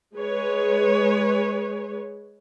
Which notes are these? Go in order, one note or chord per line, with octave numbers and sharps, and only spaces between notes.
G#3 G#4 B4 C#5